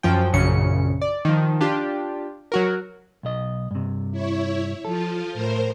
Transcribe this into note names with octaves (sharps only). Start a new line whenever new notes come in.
F#2 F3 G5
A#1 F#2 C#3 C#7
D5
D#3 F3
D4 F4 G4
F#3 F#4 A#4
B1 D#5
G2 C3
E4 C#5
F3 F4 A4
A2 A#4 C5